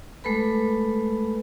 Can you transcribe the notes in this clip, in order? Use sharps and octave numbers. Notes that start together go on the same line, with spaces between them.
G#3 A3 A4 B4 B5